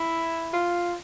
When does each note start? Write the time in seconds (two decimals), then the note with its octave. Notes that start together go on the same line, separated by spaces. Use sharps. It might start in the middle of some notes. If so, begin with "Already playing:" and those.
Already playing: E4
0.53 F4